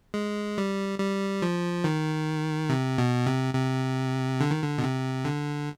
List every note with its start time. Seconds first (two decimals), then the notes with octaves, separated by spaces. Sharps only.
0.14 G#3
0.58 G3
0.99 G3
1.42 F3
1.84 D#3
2.69 C3
2.98 B2
3.27 C3
3.55 C3
4.41 D3
4.51 D#3
4.63 D3
4.78 B2
4.84 C3
5.25 D3